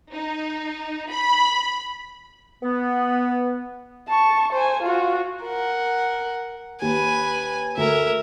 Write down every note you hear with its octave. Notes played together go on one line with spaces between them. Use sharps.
D#4
B5
B3
A5 C#6
C5 G#5
F4 F#4
A#4 F#5
D#2 B4 G#5
D2 A3 A#4 E5